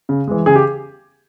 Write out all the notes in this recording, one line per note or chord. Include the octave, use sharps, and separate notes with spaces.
C#3
E3 G#3
C#3 G#4
G4